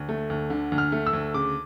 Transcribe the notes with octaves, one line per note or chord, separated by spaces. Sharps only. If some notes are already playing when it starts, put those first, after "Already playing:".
Already playing: D2
A3
D2
D3
D2
F6
A3
E6
D2
C#3 D6